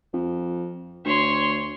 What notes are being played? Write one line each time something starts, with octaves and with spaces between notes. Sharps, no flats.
F2
D2 C#5 C6